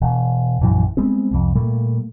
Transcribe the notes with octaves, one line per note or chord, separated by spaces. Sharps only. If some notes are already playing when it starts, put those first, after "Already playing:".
E1
A#1 F#2 E3
G3 G#3 B3 C4
C2 F2
A#2 G3 A3 A#3